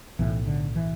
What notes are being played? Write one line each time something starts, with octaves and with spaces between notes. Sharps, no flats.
B1 A2 E3
D3
E3